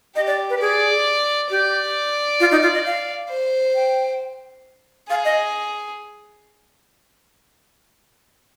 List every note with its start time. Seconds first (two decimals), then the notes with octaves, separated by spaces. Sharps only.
0.16 G4 D#5
0.27 D5
0.50 B4
0.60 G#4 D5
1.50 G4 D5
2.40 F4
2.51 D#4
2.62 F4
2.74 D#5
2.85 F5
3.30 C5
3.75 G5
5.09 G#4 F5
5.25 D#5